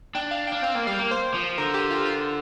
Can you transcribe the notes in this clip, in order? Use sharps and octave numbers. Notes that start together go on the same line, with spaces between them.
D4 G5
F5
G5
D4
C4 F5
A#3
G3 F5
A#3
C5
F3
D3 A#4
G4
F4
F4